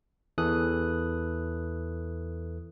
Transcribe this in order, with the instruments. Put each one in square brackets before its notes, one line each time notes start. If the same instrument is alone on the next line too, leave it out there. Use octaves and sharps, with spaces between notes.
[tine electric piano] E2 E3 A4 D#6 F#6